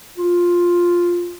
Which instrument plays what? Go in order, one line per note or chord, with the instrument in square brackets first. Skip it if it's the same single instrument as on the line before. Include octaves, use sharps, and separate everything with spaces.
[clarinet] F4